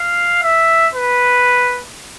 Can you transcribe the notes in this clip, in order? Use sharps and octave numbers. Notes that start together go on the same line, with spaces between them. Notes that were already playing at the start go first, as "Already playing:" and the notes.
Already playing: F5
E5
B4